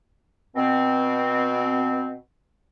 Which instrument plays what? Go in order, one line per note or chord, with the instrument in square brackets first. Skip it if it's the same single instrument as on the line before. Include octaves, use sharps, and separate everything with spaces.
[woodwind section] B2 C4